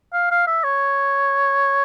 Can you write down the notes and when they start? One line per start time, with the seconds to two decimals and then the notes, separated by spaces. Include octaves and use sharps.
0.14 F5
0.31 F5
0.47 E5
0.64 C#5